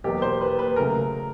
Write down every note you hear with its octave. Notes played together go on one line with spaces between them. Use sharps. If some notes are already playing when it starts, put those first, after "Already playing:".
E2 B2 F#3 A#3 G4
C5
B4
B4
C#3 F#3 A3 A#4